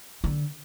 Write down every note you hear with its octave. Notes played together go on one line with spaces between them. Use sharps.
D3